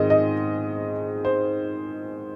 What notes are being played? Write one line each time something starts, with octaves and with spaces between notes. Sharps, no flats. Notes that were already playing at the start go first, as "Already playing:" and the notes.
Already playing: G#2 D#3 G#3 C4 D#5
D#5
C5